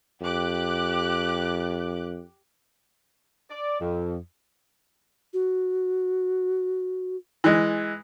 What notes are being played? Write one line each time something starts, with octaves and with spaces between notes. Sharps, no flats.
F2 G4 D6 F#6
D5
F2
F#4
E3 G#3